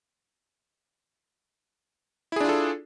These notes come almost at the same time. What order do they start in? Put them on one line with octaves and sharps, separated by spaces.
E4 G#4 D4 F4 A4